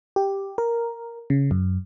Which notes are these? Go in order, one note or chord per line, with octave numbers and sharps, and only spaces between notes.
G4
A#4
C#3
F#2